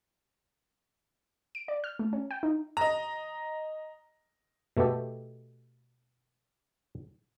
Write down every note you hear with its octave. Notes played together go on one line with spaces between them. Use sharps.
D7
D5
F6
A3
C#4
G5
D#4
D#5 A#5
B2 A3 B3 G4 A4